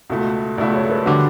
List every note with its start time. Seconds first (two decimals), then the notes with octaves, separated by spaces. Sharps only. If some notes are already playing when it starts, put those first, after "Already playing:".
0.10 C#2 B2 A3 E4
0.57 C#2 B2 A3 E4 D5
0.74 C#5
0.84 A4
0.90 B4
1.05 D3 G3 D4 F#4